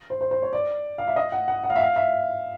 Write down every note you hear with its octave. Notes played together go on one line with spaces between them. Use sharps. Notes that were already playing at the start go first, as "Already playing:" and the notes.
C5
C5
C5
C#5
D5
F5
E5
D#5
F#5
F#5
F#5
F5
E5
F5
E5